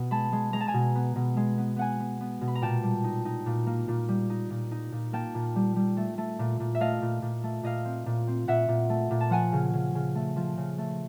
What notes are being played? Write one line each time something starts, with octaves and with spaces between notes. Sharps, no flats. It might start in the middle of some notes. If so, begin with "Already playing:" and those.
Already playing: B2 B3
G#3 A5 B5
G#3
G#3 A#5
A5
G#5 A#5
B2
B3
B2
G#3
B3
B3 F#5 G#5
B3
B3
B2
B5
A#5
A#2 G5 A5
G3
D#4
D#4
A#2
A#3
A#2
G3
D#4
A#2
D#4
A#2
A#3 G5 A5
A#2
G3
G3
A3
A3
A#2
A#2
E5
A3 D#5 F5
A#2
A#2
A3
A#2 D#5 F5
C4
A#2
C4
A#2 E5 F#5
A#2
A3
A#2
A5
F3 F#5 G#5
C#3
C#3
C#3
A3
F3
C#3
A3